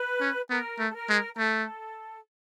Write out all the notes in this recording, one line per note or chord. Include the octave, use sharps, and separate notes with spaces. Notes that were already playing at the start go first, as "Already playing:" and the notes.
Already playing: B4
C#4
B3 A#4
A3
A4
A#4
G#3
A#4
A3 A4